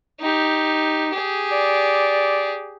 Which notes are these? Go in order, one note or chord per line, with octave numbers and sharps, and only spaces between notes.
D#4 G4
G4 G#4
D5